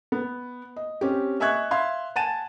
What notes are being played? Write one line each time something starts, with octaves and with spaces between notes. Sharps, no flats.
B3
D#5
C4 C#4 G4
D#5 E5 G#5 C#6 F#6 G#6
E5 F5 C6 G#6
F#5 G#5 A5 A6 D#7 E7